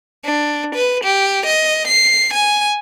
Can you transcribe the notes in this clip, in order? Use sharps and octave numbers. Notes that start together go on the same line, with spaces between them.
D4
B4
G4
D#5
C7
G#5